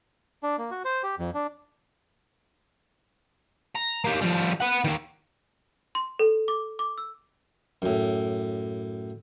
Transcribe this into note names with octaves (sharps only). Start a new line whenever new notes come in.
D4
A#3
F#4
C5
G4
F2
D4
A#5
A#3 G4
F3 G3
B4 F#5
D#3 A#3
C6
A4
D6
D6
E6
F#2 A2